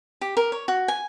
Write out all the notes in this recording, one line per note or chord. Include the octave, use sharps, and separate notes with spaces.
G4
A#4
C#5
F#4
G#5